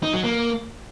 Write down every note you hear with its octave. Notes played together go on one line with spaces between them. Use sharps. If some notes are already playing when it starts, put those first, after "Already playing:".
D#4
F#3
A#3